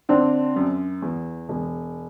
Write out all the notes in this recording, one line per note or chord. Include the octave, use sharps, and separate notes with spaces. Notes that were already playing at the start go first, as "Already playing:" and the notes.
D3 C4 D4
F#2
E2
E1